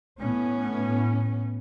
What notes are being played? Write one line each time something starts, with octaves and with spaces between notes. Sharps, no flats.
A2 B3 C#4